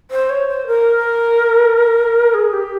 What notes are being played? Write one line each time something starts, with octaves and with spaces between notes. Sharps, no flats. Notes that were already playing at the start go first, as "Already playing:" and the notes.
C5
C#5
C5
A#4
G#4
G4